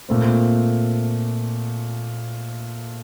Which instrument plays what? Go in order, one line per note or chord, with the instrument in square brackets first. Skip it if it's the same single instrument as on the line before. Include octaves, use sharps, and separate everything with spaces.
[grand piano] A#2 A3 C4